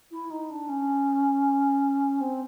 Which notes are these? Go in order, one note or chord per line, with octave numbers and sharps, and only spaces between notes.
E4
D#4
D4
C#4
C4